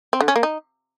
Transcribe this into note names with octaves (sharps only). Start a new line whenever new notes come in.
C4
D3
C#4
A#3
D#4